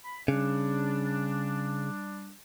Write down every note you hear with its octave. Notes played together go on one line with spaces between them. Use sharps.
B5
C#3 G3 D4